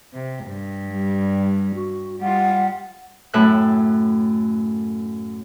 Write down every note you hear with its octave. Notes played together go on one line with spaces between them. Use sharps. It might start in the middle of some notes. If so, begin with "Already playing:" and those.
C3
G2
G3
F#4
G3 F4 F#5
F#2 A2 A3 E5 G5 F#6